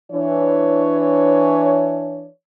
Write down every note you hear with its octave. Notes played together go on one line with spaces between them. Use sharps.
E3 D4 C#5